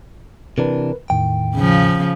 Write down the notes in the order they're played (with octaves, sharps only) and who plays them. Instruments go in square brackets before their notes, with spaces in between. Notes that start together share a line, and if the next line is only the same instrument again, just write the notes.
[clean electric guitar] C3 E3 D4 [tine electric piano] A#4 B4
[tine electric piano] E2 A2 D#3 [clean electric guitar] G5
[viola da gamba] C#3 F3